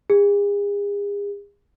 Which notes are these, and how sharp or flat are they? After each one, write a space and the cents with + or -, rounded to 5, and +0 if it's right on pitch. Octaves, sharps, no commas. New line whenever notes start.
G#4 -40